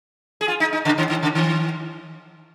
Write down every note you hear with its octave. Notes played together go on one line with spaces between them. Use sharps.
G#4
F4
D#4
D#4
C#3
D#3
D#3
C#3
D#3